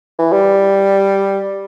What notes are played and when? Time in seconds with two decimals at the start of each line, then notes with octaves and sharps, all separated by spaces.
0.19 E3
0.33 G3